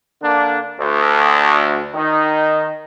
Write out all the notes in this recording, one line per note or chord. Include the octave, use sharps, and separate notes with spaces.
D3 A#3 D4
D2
D#3 D#4